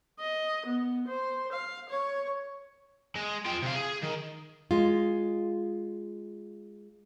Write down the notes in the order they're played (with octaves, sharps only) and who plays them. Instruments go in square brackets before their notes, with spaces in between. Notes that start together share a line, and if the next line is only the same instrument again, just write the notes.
[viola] D#5
B3
C5
F5
C#5
[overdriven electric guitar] G#3
F4 G5
C3 F5
G#4
D#3
[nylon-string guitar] G#3 F4